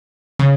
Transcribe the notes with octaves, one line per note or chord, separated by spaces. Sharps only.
C#3